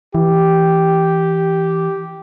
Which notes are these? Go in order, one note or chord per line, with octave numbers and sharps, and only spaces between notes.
E3 G4